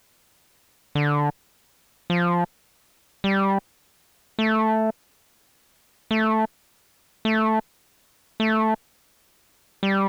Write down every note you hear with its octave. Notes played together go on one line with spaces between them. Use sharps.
D3
F3
G3
A3
A3
A3
A3
G3